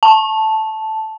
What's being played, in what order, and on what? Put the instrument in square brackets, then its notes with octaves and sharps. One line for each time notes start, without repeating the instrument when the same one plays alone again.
[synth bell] A5